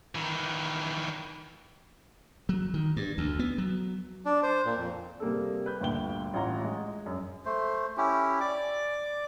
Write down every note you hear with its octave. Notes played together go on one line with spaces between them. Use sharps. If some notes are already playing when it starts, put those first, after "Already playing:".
D#3 E3
F#3
D#3
G2
D2
B3
F#3
D4
C5
A#2
F2
C3 G3 A#3 G#4 A4
B4 G6
G1 D2 A#2 G5 G7
A1 F4 F#5 A#5
G#3
F#2
A3 C5
C#4 E4 G4
D5 D6